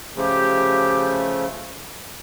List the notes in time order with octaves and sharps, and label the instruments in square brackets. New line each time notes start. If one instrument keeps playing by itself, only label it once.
[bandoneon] C#3 F3 A3 [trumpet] G4